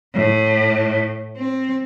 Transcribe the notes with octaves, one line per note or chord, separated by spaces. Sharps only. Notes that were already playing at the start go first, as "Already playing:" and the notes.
A2
C4